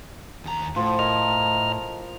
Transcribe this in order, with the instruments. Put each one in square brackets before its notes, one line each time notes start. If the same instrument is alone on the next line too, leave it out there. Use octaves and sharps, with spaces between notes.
[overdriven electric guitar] D#2 A#5
[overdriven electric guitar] A2 [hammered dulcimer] F3
[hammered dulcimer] A#4 [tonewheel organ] D#5 A#5 F6